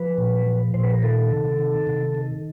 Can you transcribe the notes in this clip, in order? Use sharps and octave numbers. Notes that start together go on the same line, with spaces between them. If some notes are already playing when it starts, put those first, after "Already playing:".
Already playing: F3 B4
A#2
F3
A#2 C5
B4
A#4
D#3 A4
C3
D#3
C3
D#3